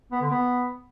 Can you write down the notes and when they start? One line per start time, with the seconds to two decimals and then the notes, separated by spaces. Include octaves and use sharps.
0.12 B3
0.21 D3
0.31 B3